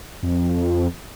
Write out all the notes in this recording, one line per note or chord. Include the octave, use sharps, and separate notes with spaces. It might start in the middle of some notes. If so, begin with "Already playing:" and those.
F2